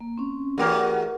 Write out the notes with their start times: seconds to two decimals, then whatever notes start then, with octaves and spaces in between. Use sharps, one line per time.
0.01 A#3
0.18 C4 C#4
0.58 E2 A3 F#4 G4 A#4 F#5